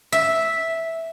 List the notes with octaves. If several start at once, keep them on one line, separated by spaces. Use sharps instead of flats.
E5